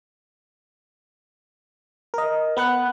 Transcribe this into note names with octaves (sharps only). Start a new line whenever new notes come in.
A#4 D#5
B3 B4 F#5 F#6